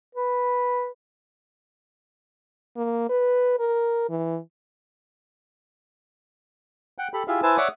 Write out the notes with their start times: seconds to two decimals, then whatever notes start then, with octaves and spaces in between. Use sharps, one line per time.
0.15 B4
2.76 A#3
3.09 B4
3.59 A#4
4.09 E3
6.98 F#5 G5
7.14 G4 A4 B5
7.28 E4 F4 G4 G#4 E5 F5
7.43 E4 B4 C5 G#5 A5 E6
7.57 C#5 D5 E5 F#5 D6 D#6